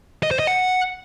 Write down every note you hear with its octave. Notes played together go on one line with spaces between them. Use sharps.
D#5
C5
D#5
F#5